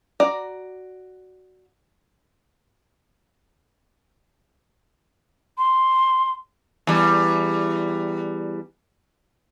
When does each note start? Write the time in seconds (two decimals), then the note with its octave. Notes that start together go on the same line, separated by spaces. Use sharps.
0.20 F#4 D5 A#5
5.58 C6
6.87 E2 G3